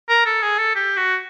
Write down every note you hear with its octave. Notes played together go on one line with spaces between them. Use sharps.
A#4
A4
G#4
A4
G4
F#4